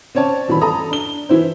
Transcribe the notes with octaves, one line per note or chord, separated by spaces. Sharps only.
C4 C#4 C#5 D5 A5
D#1 E3 B5
A4 A#5 D#6
D4 G7
E3 E4 C5